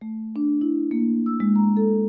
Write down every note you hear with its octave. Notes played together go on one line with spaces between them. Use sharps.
A3
D4
E4
A#3
E6
G#3
A#5
A4